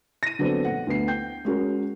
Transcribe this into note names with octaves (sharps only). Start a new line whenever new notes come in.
A#6 D#7
D3 F#3 B3 C4 D4 A4
A#1 F#5
D2 B3 C7
G5 G6
G#3 C#4 F#4 A#4